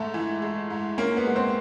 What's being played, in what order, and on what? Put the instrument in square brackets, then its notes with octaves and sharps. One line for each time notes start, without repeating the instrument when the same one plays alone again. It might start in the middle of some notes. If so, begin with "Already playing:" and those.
Already playing: [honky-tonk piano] G#2 [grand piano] A3
[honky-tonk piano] E3
G#3
G#2
[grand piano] A#3 [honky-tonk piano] C#4
[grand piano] B3
[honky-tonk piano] G#3
[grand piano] C4